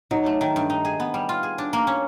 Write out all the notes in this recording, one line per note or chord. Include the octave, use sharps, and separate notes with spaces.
F#3 D#4
A3
D#3
G2
D#4
G#4
B3
G3
F4
G#4
D4
A#3
C#4